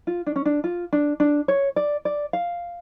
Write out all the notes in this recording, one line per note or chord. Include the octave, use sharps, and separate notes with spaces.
F4
D4
C#4
D4
F4
D4
D4
C#5
D5
D5
F5